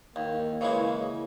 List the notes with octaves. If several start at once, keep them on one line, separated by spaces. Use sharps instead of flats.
D#2 A#3
C#3 E3 G#3